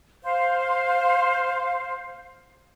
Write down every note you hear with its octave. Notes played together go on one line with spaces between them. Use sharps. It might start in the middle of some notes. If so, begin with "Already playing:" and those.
C5 F5